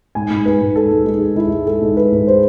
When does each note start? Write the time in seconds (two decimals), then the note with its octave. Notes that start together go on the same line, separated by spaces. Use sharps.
0.15 G#2 G#5
0.30 G#2
0.46 G#2 B4
0.61 G#2
0.75 G#3 A4
0.91 G#2
1.06 G#2 G#4
1.21 G#3
1.36 G#3 E4
1.51 G#3
1.67 G#3 A4
1.81 G#2
1.96 G#3 B4
2.12 G#2
2.27 G#3 C5